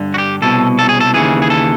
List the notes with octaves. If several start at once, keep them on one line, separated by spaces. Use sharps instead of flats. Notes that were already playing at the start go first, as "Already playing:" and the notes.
Already playing: G2 D3
F#4
G4
C2 B2 A4
A4
G#4
A4
D#2 C#3 E3 G#4
G#4
A4